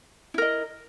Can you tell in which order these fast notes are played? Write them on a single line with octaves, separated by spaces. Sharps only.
E4 A#4 D#5